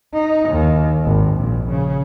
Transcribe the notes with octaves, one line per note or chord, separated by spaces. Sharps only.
D#4
D#2
G#1
A#1
C#3